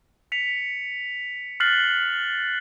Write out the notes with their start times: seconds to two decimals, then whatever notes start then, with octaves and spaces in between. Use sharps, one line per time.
0.32 B6 C#7 F7
1.60 F6 F#6 A6 B6 C7 F#7